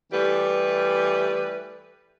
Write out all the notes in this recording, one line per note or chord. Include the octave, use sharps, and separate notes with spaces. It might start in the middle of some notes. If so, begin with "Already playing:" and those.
E3 G3 A3 G4 B4